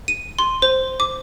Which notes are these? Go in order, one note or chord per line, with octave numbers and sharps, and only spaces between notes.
D#7
C6
C5
D6